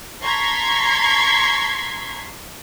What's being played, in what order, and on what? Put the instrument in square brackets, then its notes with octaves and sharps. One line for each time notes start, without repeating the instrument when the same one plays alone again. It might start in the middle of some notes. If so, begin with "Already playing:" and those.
[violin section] A5 A#5 C6 C#6 G#6 B6